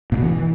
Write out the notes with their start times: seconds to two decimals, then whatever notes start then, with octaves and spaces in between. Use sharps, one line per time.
0.12 A#2
0.17 B2
0.22 E3